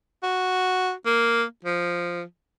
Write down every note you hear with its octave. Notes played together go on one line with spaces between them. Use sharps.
F#4
A#3
F3